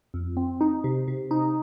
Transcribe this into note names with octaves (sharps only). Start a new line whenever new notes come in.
F2
C4
D#4
C3
C3
D#4